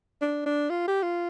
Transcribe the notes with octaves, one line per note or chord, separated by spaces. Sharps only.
D4
D4
F4
G4
F4